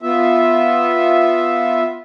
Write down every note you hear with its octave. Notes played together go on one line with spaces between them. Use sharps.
B3 F4 E5